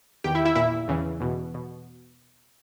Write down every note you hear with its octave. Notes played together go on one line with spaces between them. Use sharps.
E2 D#3 G4 G5
E4 E5
E4 E5
A#2 E4 E5
E2 C#3 E3
E2 B2
B2